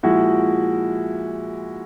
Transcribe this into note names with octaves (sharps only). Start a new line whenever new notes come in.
A#2 F3 G#3 E4 F#4